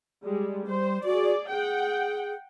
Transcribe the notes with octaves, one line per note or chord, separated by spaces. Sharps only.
G3 G#3
G3 C5
F#4 G#4 D5
G#4 F#5 G5